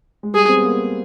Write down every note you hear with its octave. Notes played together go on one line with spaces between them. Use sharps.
G#3
G3 G#4
C4
B3
A#3